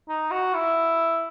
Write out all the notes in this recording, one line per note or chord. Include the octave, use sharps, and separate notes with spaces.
D#4
F#4
E4